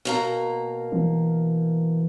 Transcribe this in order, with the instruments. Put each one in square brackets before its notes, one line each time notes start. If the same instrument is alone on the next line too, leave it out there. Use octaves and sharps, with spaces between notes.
[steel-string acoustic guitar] B2 A#3 A#5
[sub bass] E3